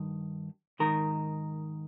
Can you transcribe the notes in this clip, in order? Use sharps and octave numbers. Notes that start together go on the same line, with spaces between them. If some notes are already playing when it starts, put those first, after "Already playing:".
Already playing: G2 D#3
G#2 D#3 A#4